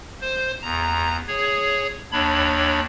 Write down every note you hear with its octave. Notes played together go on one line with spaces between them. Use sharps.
C5
E2 A#5
G#4 C#5
D#2 D4 C#5 B5